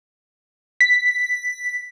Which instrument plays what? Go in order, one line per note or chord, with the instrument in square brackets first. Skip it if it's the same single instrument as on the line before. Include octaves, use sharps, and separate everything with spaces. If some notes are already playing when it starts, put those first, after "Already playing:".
[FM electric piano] B6